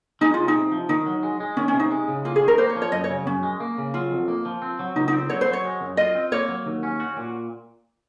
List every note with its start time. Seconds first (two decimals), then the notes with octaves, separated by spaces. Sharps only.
0.21 G#3 D#4
0.34 C#3 F4
0.48 D#4
0.55 C3
0.72 F3
0.89 D#3 D#4
1.06 F#3
1.23 G#3
1.40 G#3
1.57 D#3 C#4
1.68 C#4
1.74 C3
1.80 D#4
1.91 G#3
2.08 C#3
2.25 A#3 F4
2.36 G#4
2.42 D#3
2.48 A#4
2.58 A#3 C5
2.69 C#5
2.76 F3
2.82 C#5
2.92 F#2 D#5
3.04 C#5
3.09 C#3
3.26 F#2 C#4
3.43 G#3
3.60 A#3
3.78 C#3
3.94 F#3 F4
4.11 F2
4.28 A#3
4.45 F3
4.62 C4
4.79 F#3
4.96 C#2 D#4
5.08 D#4
5.13 C4
5.30 F#3 C#5
5.41 C5
5.47 F#3
5.53 C#5
5.65 G#3
5.81 F#2
5.97 F4 D#5
6.15 C4
6.32 A#3 C#5
6.49 F#3
6.66 D#2
6.83 C#4
7.00 F#4
7.17 A#2